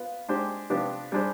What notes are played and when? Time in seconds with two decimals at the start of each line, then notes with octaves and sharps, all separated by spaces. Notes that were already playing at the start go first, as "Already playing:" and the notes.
Already playing: B3 F4 B4
0.29 G#3 D4 G4 C5
0.70 C3 F3 B3 D4 G4
1.12 G3 D4 G#4 C5